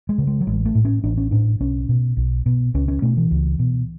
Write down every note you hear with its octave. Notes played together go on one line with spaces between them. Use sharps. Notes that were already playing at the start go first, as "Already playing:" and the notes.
G#3
C#3
G#3
F#3
A1 G#3
A3
A2
C#4
A1 D4
C#4
A2 D4
B1 C#4
B2
B1
B2
C#2 C#4
C#4
B2 A3
E3
C#2
B2